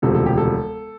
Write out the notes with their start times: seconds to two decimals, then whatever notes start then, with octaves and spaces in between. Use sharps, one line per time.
0.02 E1 D2 C3 F3 A4
0.14 A4
0.26 G4
0.38 A4